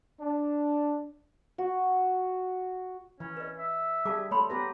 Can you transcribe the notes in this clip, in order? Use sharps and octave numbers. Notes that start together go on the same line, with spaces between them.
D4
F#4
E3 C#4
B4 D#5
E5
G3 G#4 F5 A5 D6
A3 A4 C#5 B5 C6
B3 G4 B4 A#5